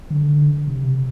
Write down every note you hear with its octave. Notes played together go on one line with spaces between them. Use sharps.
D3
C3